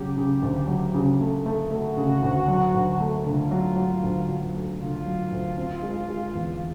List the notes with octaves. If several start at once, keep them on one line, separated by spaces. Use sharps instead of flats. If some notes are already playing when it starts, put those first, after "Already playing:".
Already playing: C#3 F#3 A3 G4
C#3
D2
F#3
C#3
A3
A3
A3 F#4
C#3
D2
F#3
D2
A3
D3 F4
F#3
F#3
D2
F#3
A3
D3 F4
F#3
D2
C4
G#3
G#3
E2